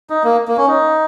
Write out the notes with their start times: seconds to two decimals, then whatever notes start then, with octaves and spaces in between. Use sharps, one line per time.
0.10 D#4
0.24 A#3
0.48 A#3
0.57 C#4
0.68 D#4